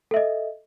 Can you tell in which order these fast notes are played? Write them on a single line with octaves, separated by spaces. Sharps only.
A4 E5 D#5